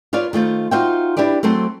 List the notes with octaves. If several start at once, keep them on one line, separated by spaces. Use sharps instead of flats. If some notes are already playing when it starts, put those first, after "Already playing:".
F4 B4 C#5 D5 F5
D#3 A3 F4 C5
D#4 F4 F#4 C5 E5 G5
D4 E4 G4 B4 D5
F#3 A3 C4 C5 A5